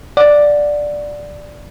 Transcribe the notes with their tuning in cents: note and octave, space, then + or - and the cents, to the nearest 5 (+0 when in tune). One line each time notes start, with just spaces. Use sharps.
D5 +0 F#5 -15